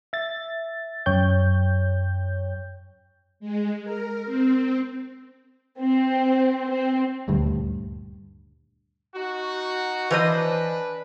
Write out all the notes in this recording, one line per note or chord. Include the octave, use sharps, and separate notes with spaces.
E5 A6
F#2 C#5 G5 G6
G#3
A#4
C4
C4
C4
D#1 D2 G2
D#4 F#4
E3 D4 B4 C5 D#5